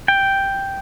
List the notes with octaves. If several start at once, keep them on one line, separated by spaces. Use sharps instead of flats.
G5